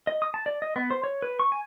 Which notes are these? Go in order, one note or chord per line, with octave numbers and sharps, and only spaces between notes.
D#5
D#6
A5
D5
D#5
B3
C5
C#5
B4
C#6
G#5